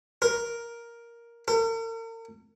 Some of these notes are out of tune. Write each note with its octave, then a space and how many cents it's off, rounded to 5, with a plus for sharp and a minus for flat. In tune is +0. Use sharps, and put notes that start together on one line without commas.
A#4 +5
A#4 -45